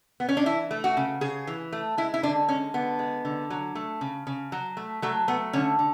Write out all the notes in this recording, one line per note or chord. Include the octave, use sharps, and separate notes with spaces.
B3
C#4
D4
E3 E4
A3
F#4
C#3
C#3 G#4
E3
A3
G#3 E4
E4
D3 D4
G#3 C#4
D3 B3
G#3
D3
F#3
A3
C#3
C#3
F#3
A3
F#3 A3
A3 B3
D3 C#4
D3